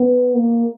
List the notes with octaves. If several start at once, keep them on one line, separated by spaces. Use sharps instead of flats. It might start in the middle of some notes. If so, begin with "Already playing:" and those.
Already playing: B3
A#3